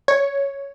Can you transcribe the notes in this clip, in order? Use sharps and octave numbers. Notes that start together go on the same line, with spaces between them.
C#5